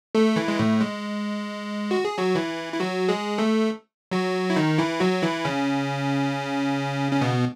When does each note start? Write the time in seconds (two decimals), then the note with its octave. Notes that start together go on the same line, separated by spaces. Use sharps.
0.15 A3 A4
0.36 E3 E4
0.48 G#3
0.59 A2 A3
0.81 G#3
1.91 F#4
2.05 G#4
2.18 F#3 F#4
2.35 E3 E4
2.73 E4
2.80 F#3 F#4
3.09 G#3 G#4
3.38 A3 A4
4.12 F#3 F#4
4.50 E4
4.56 D#3 D#4
4.78 E3 E4
5.00 F#3 F#4
5.22 E3 E4
5.45 C#3 C#4
7.12 C#4
7.21 B2 B3